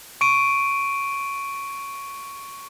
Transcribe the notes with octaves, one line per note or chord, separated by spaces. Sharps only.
C#6 D7 D#7